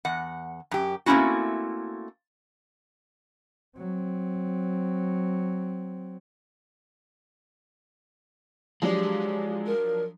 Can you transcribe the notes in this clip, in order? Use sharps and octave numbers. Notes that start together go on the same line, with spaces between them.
E2 F#5
F#2 G4
A3 A#3 C4 C#4 E4 F#4
F#3 C4
F3 F#3 G#3 D4 G4
A#4